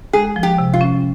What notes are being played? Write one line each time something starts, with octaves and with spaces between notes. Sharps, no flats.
G#3 G#4
F3
G4
C3
F4
C#4